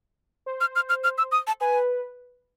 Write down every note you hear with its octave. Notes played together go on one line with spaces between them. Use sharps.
C5
F6
F6
F6
F6
E6
D#6
A5
B4 G#5